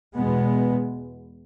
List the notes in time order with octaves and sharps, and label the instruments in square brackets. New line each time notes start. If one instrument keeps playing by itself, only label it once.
[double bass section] E2 B2 G#3 B3